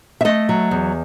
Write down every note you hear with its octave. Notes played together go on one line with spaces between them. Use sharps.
E5
A3 D#5
F#3
E2